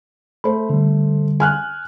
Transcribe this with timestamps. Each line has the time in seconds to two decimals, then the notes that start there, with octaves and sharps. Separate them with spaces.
0.44 A3 C5 B5
0.70 D3 G3
1.40 G#5 F6 F#6